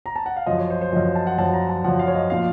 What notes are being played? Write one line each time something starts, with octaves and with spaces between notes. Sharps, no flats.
A#5
A5
F#5
F5
F#2 F3 D#5
C#5
C5
C5
F#2 F3 D#5
A5
F#5
F#2 F3 A5
A#5
A5
F#2 F3 F#5
F5
C#5
D#5
A#2 F3 F5